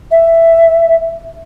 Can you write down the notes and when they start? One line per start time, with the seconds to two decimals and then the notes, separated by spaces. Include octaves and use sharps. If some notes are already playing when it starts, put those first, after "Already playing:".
0.11 E5